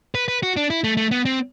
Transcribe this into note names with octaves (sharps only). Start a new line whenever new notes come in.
B4
B4
F#4
D4
E4
A3
A3
B3
C4